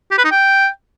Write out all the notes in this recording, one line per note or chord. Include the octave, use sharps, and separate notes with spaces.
G4
B4
D#4
G5